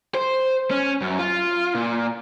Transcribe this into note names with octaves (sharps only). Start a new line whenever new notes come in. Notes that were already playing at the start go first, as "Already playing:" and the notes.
C5
C#4
F#2
F4
A#2